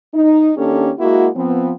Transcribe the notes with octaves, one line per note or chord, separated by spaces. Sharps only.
D#4
D#3 A#3 C#4 D4 G4 A4
G#3 A#3 E4 F#4
F3 B3 C4